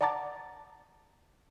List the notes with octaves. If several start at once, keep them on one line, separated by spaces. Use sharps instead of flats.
D5 F#5 A5 A#5 D6 A6